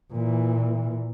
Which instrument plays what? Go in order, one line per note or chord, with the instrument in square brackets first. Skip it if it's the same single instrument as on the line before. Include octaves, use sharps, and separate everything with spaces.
[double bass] A#2 E3